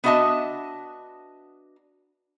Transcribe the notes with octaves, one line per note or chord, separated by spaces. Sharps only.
B3 D4 F#4 D#5 E5 A5